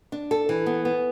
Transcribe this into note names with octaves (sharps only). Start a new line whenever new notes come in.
D4
A4
E3
B3
B3